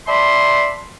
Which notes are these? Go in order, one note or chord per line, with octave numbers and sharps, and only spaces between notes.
D5 E5 A5 B5 C6